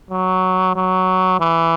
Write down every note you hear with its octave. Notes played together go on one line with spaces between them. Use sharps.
F#3
F#3
E3